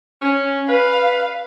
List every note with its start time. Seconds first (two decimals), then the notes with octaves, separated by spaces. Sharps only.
0.22 C#4
0.69 B4 F5